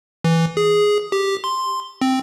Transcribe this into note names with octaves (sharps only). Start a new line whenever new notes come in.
E3
G#4
G4
C6
C4